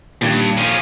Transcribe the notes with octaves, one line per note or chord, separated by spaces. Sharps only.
G2 A#2 D#3
F3 C#4